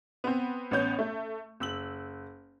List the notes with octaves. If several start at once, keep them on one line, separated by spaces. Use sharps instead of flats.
B3 C4
A1 B3 C#4 G6
A3
F#1 E6 F#7